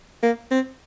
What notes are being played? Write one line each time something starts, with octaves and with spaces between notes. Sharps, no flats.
A#3
C4